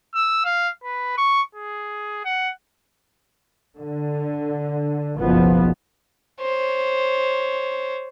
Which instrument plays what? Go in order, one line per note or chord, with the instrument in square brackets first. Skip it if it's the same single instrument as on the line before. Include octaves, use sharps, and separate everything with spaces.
[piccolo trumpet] E6
F5
B4
C#6
G#4
F#5
[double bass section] D3
F#1 B1 F3 B3
[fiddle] C5 C#5